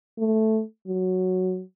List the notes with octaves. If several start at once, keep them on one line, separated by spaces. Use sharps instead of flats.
A3
F#3